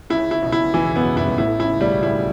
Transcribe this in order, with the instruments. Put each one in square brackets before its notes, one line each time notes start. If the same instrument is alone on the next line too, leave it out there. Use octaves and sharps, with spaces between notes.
[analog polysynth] C#2 C#3 [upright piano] E4
[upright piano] E4
[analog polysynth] B1 B2
[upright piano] E4
[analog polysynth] E2 [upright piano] E3
[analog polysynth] F#2 [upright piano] B3
[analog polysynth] G1 G2 [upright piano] E4
[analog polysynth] A1 A2 [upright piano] E4
[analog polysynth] C#2 C#3 [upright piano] E4
[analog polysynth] B1 B2 [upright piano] G3
[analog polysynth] A1 A2 [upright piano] E4